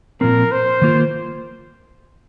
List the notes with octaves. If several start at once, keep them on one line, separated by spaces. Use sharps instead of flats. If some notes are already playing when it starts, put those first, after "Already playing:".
A#2 F3 C4 A#4
C5
D#3 A#3 F4 A#4